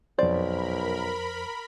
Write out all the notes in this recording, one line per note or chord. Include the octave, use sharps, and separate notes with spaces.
B1 F2 A#4 C5 D5 B5